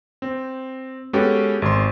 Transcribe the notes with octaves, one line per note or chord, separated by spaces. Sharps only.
C4
G#3 B3 C#4 F#4 G4 A4
G#1 C6